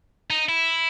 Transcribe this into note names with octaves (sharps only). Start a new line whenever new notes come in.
D#4
E4